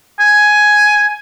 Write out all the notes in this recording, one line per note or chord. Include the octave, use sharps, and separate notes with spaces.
G#5